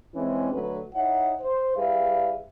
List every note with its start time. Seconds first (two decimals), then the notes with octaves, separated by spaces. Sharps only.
0.15 E3 G#3 C4 C#4 E4
0.53 D3 F#3 A3 B4
0.94 D#4 E4 C#5 F#5
1.41 C5
1.77 G3 E4 G#4 B4 F5